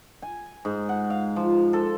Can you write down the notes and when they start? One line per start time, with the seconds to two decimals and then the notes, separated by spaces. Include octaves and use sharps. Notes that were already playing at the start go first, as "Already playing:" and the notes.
0.22 G#5
0.65 G#2
0.89 F#5
1.10 F5
1.36 F3
1.73 A4